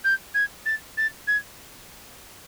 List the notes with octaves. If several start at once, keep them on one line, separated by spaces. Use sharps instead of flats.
G6
G#6
A6
A6
G#6